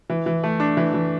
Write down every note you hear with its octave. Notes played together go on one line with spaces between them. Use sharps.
E3
E3
A3
D4
E3
E3